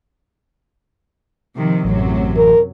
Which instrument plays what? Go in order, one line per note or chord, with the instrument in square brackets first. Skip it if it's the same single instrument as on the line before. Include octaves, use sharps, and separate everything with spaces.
[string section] C3 D#3 F3
[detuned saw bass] A1 [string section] F#2 C3 F#3
[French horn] A#4